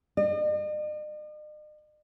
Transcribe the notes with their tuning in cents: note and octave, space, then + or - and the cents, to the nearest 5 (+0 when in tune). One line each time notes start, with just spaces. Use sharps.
D#5 -45